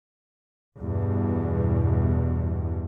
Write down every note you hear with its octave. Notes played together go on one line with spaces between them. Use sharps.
E2 G2 B2